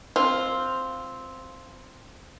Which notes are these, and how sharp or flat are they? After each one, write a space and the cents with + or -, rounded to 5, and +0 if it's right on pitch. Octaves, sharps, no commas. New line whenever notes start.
C4 +0 F4 +0